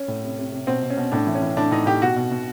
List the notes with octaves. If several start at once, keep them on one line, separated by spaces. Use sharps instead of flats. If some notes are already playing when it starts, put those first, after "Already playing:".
Already playing: C#4
A2
C3
C3
C3
B2 C4
B2
C#4
B2
A2 D4
E3
C#4
E3
A2 D4
A2 D#4
A2 G4
B2 F#4
B2
B2